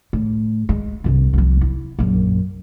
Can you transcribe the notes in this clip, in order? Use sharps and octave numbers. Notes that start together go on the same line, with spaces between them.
A2
G#3
C2 G2
C2 F3
E4
A#1 F#2